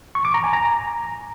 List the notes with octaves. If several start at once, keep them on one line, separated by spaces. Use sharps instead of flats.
C#6
D6
A#5
G#5
A#5